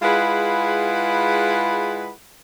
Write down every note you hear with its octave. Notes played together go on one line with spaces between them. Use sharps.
G#3 E4 F4 G#4 B4 F#5